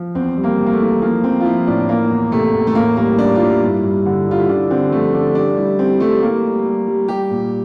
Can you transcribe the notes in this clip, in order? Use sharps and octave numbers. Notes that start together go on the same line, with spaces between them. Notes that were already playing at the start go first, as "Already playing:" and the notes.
Already playing: F3
E2 C4
G3
A#3
C3
A#3
A3
E3
F3 A#3
F3 C4
F4
F3 E4
A2 D4
E3 A#3
E2
C3 A3
E2
A3
A2 A#3
G3 A#3
G3 D4
F4
G3 E4
G2
G2
D3
G3 F4
E4
D3 D4
D3 C4
F3 A3
D3 D4
G3 D4
G3 E4
G3 C4
G3 A3
G3 A#3
G3
G3
G3
G3 G4
A#2